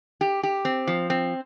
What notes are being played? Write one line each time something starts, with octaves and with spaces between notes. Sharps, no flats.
G4
G4
C4
F3
C4